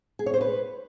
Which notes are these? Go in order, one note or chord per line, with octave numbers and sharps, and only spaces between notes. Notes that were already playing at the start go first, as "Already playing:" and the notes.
G#4
C#5
C5
B4